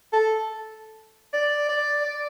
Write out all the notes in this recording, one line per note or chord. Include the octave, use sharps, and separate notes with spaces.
A4
D5
D5
D5